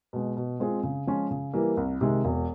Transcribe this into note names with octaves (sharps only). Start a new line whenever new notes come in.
B2 G#3
B2
G#3 C4 F4 G#4
C#3
F3 G#3 C#4 F4
C#3
E3 G3 A#3
C2
C3 D#3 G#3
E1